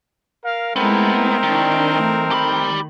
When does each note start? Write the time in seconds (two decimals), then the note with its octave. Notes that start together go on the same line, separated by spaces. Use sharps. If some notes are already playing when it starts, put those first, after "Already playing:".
0.45 A#4 F5
0.76 G#3 A3 B3 C4 D#4 E4 A#4
1.43 D#3 D4 E4
1.91 E3 A3
2.31 D#3 G4 B5